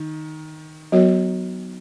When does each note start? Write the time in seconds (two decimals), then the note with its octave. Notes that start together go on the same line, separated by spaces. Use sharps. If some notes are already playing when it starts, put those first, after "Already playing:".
Already playing: D#3
0.92 F#3 B3 F#4 A#4 C#5